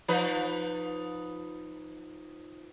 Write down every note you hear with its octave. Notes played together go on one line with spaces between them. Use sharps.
F3 D#4 B4